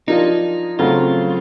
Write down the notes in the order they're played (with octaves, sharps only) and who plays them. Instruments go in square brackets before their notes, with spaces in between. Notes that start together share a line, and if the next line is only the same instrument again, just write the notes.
[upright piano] F3 A#3 D4 F4 [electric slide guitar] D#4
[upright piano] C#3 F#3 A3 C4 [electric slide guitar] F4